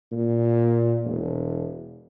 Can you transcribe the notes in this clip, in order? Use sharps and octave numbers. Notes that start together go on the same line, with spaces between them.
A#2
E1